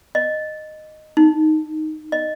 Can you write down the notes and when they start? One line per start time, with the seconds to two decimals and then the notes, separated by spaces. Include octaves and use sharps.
0.15 D#5
1.17 D#4
2.12 D#5